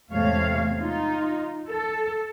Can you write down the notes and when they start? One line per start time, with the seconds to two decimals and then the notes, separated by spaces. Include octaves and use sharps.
0.12 E2 G#2 C3 A3 C#5 F5
0.78 D#4 F4
1.68 A4